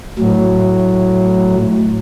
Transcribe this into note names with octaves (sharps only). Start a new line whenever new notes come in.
A2 F#3